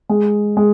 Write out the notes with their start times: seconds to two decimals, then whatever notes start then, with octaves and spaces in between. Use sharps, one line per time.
0.09 G#3
0.57 G#3